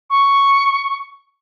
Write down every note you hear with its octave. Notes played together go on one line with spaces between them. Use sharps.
C#6